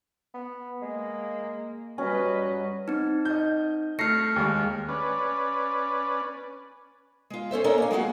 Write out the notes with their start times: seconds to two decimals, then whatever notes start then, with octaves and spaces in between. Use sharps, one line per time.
0.34 B3
0.82 G#3 A#3
1.98 F#3 G3 C#4 B4 D#5
2.88 C4 D#4
3.25 D#5 G6
3.99 A3 F6 A#6 C7 C#7
4.36 D#2 G#3
4.88 C#4 B4 D5
7.30 G#3 F4
7.51 C#4 A4 C5 E5
7.64 C#4 D4 A4 A#4 C#5 D#5
7.78 A#3 G#5
7.91 F#3 G#3 F4 F#4 G#4